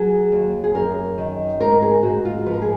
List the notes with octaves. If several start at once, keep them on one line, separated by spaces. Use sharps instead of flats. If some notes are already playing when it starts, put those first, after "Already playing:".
Already playing: F#3 G#4
D#2
G#4
F#2 A#4
D#3
G#2 A#4
G#4
G#2 F#4
F4
F3 B4
A#4
G#4